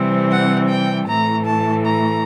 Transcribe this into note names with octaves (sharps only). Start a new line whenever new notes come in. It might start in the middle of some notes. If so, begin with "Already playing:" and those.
Already playing: C3 E3 G3 C4
F#5
G5
A2 E3 A3 A#5
A5
A#5